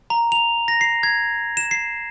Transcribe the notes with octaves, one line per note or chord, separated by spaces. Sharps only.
A#5
F7
A#6
C7
G#6
E7
C7